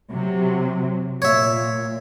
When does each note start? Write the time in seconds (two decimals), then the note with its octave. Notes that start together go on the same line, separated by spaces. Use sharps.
0.11 C3 F#3
1.22 A#2 C#5 E5